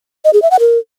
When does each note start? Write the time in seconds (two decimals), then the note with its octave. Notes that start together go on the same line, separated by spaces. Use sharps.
0.25 D#5
0.33 G#4
0.42 E5
0.51 F#5
0.60 A#4